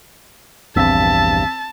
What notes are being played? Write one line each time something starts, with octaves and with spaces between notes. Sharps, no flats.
A#1 E2 G2 C4 A5 E6 B6